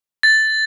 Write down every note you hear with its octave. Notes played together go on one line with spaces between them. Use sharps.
A6